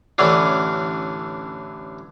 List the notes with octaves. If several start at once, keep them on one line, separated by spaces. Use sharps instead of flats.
A1 D3 E3 C#4 D4